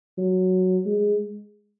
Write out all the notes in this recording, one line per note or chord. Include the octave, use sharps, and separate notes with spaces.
F#3
G#3